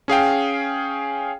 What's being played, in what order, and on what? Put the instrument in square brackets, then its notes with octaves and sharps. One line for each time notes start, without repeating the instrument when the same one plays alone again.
[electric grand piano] C#4 G#4 F5 G5